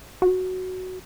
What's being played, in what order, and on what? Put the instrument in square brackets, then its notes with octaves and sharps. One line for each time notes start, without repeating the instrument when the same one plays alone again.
[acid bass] F#4